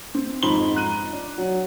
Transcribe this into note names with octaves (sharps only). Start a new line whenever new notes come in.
C4
F2 G#2 D#4 B5 C6 G7
A#5 F#6 D#7
D4
F#3